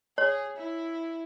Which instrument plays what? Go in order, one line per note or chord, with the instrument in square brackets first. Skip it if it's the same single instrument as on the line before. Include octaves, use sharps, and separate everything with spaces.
[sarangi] G#4 [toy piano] C#5
[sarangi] E4